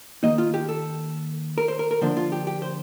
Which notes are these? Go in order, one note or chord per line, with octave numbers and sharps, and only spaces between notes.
D#3 A#3 D#4 D#5
F4
G4
A4
A#4
C5
A#4
A#4
D3 F3 A#3 D4 C5
F4
G4
G4
C5